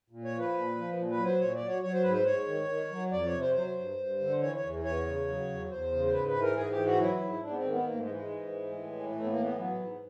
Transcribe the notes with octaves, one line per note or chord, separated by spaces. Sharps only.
A#2
C#5
F3
B4
A#2
F3
A#2
B4
F#3
C5
A#2 C#5
D5
F#3
C#5
F#3 C#5
C5
G#2 B4
C5
G#2 C#5
D#3
D#3
F#3
F2 D5
C#5
C3
C5
F#3 C5
G2
G2
D3
E3 C#5
C#5
E2
E2 C#5
C#3
F#3
E2
E2 C5
C#3
C5
G#2 B4
B4
E3
A#4
G#2 G#4
G4
E3
F#4
F#3 E4
G#2
G#2 D4
B3
C4
D#3
B3
G#2 A#3
A3
G#3
E3
G#3
G#2
E3
A2
E3
A2 A3
B3
A#3
E3
B3
F#3 B3
G#2